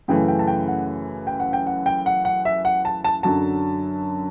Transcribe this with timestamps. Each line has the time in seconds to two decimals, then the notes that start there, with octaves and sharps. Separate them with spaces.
0.08 F#2 C#3 E3 A3 G5
0.28 G5
0.39 A5
0.48 G5
0.68 F#5
1.27 G5
1.40 F#5
1.53 G5
1.67 F#5
1.86 G5
2.06 F#5
2.25 F#5
2.45 E5
2.65 F#5
2.85 A5
3.04 A5
3.23 F#2 D3 F#3 A5